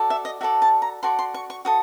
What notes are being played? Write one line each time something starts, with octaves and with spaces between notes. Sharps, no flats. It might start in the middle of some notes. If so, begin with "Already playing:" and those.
Already playing: F#4 A4 D5
E5
D#5
F#4 A4 D5 E5
A5
A#5
F#4 A4 D5 C6
C6
C#6
C#6
F#4 A4 D#6